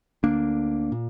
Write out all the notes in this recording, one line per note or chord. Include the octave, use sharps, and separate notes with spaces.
D2 D3 A#3 D4
A#2